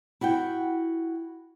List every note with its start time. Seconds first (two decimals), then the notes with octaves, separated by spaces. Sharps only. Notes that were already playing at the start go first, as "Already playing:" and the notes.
0.21 E4 F#4 F#5 G5